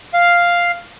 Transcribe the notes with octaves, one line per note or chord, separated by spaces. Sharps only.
F5